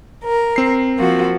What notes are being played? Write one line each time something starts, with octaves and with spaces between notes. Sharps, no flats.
A#4
C4 C7
F3 A#3 F#4